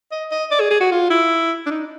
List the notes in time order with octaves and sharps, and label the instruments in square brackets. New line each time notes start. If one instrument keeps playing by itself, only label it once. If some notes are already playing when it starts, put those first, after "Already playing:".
[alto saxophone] D#5
D#5
D5
G#4
G#4
F#4
F4
E4
D4
D#4